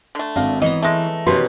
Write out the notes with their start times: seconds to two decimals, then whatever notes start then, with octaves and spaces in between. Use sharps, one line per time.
0.15 D3 A3
0.36 G#1 D4 D#5 F5
0.62 E3 B3 C#5 D#5 A#5
0.82 G#3 A3 E5 A#6
1.27 B2 D#3 C#4 G4 A#4 B4 C6